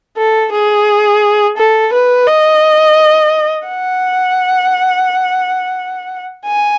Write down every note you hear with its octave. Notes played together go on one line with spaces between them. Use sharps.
A4
G#4
A4
B4
D#5
F#5
G#5